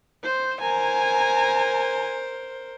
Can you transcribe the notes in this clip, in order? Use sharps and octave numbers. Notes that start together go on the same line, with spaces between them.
C5
A#4 C5 G#5 A#5